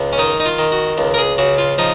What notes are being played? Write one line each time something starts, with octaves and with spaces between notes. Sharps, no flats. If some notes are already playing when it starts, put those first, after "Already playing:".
Already playing: C#2
C#4
D#3 D#4
D#4
F4
D#3
F#4
C#2
A#4
G#4
C#3 F#4
F4
F3 D#4